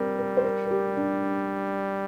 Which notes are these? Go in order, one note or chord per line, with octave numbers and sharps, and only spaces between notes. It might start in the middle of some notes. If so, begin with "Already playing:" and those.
Already playing: G3 C4 A#4
A#4
C5
A#4
A#4
G4
D4